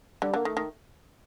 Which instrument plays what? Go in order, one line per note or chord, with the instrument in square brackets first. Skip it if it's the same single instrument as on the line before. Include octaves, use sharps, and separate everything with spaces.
[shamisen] D3 [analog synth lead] G3
[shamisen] D3 [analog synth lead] A#3
[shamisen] D#3 [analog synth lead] A3
[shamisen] D#3